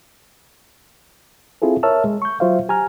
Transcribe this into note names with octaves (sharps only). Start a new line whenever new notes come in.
C4 E4 F4 G#4 A4
A#4 C#5 E5 A5 E6 F6
G#3
C#6 G6
F#3 F4 C5 E5 F5
G4 G#5 A#5 F6